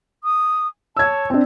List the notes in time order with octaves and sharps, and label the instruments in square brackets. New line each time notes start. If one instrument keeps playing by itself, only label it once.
[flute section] D#6
[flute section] C#5 A5 [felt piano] E6 G#6
[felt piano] C4 D4